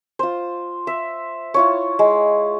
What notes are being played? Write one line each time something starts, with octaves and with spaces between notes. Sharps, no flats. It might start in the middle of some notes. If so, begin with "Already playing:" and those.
F4 C5
E5
E4 F4 C#5
G#3